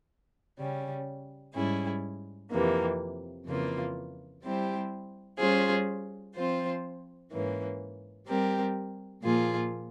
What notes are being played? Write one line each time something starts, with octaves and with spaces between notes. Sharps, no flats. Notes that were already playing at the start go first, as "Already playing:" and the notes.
C#3 G3 C#4
G#2 G3 C#4 E4 G#4
F2 C3 E3 A#3
F2 C#3 E3 A#3 F4
G3 C4 E4 G4 C5
G3 C#4 F4 G#4 C5
F3 C4 F4 C5
G#2 E3 A#3 C#4
G3 C4 G4 A#4
A#2 F3 A#3 F4 G#4